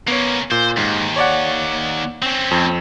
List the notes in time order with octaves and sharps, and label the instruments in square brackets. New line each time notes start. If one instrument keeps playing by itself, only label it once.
[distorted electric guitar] A#3 C#4 [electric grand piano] B3 C#5
[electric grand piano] A#2 [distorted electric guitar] C5
[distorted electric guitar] D#2 [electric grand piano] G#2
[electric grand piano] C#5 D5 F#5
[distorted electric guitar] C4 C#4
[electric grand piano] F2